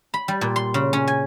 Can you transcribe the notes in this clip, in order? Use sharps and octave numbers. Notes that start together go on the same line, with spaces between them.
B5
G3
A#2
C6
C#3
C#4
G#5